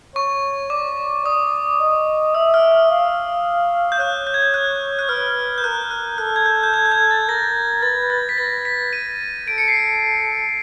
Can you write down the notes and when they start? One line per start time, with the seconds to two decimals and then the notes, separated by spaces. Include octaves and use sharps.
0.15 C#5 C#6
0.70 D5 D6
1.26 D5 D#6
1.80 D#5
2.34 E5 E6
2.54 F6
2.72 F6
2.90 F5
3.92 G6
3.99 C#5 F#6
4.27 G6
4.34 G#6
4.42 G6
4.54 F#6
4.99 F#6
5.09 B4 F6
5.58 G6
5.64 A#4 F#6
5.91 F#6
6.18 A4 F#6
6.36 G#6
6.46 G6
6.63 G6
6.74 G#6
6.85 G6
6.92 G#6
7.11 A6
7.28 A#4 A#6
7.83 B4 A6
8.10 A6
8.29 B6
8.38 B4 A#6
8.65 B6
8.93 D#7
9.47 A4 D7
9.58 C#7
9.68 C7
9.77 C#7